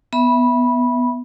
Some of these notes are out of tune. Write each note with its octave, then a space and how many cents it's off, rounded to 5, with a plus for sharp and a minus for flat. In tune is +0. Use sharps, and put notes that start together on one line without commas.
B3 +0 E5 +0 B5 -15